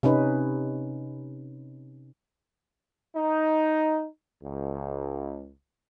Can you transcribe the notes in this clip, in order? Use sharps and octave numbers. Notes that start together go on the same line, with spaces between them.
C3 C#4 D#4 B4
D#4
C#2